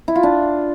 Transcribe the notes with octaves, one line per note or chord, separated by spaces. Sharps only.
E4
F4
D4